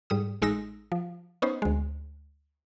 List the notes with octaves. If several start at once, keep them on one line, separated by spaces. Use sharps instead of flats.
G#2 G3 D#6
A1 G#3 D#4 E6 A#6
F3
B3 C#4 D#4 C5
D2 G#3